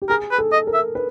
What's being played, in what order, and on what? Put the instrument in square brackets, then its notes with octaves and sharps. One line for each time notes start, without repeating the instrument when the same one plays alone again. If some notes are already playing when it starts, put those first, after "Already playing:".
[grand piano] G4
[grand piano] G#4 [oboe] A#4
[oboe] B4
[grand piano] A4
[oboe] D#5
[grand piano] A#4
[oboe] E5
[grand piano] B4